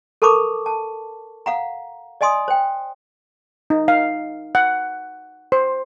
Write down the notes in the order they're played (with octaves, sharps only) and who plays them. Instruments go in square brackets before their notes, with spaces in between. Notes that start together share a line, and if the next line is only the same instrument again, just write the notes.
[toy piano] A4 A#4 A5 B5 C#6 D6
A5
F5 F#5 A#5
D5 D#5 G#5 C6 D#6
C5 G5
[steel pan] D#4
F5
F#5
C5